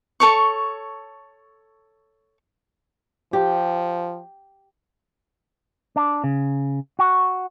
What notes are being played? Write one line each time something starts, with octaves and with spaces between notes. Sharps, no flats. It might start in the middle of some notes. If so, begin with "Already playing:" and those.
A4 C#5 C#6
F3 G4
D4
C#3
F#4